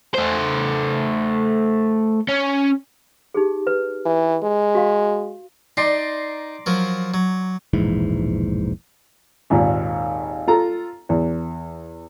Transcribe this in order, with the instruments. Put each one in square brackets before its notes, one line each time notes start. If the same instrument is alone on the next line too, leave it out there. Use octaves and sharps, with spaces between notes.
[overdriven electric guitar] A3 C5
C#4
[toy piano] D#4 G4 G#4
B4
[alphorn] E3
G#3
[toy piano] F#4 F5
[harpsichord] D#4 [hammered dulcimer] D5 A#5 C6
[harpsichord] F3 F#3 A#4
F#3
[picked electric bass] E1 A#1 G#2 E3
[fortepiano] G#1 D#2 A#2
F4 A4 A#5
E2